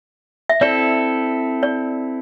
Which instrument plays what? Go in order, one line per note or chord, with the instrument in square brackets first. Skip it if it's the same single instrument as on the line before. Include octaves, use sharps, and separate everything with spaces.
[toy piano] E5
[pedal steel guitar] C4 E4 A4 [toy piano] D5
[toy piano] D5